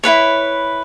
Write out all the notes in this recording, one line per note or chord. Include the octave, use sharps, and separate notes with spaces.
E4 F4 B4 C#5